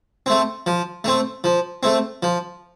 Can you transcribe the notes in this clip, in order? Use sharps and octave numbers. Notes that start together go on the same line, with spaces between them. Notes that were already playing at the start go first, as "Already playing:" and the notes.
A3 C4
F3
A3 C4
F3
A3 C4
F3